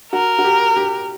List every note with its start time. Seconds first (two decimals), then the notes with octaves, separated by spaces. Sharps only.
0.12 F#4 A#4
0.39 F#4
0.44 G4
0.76 G4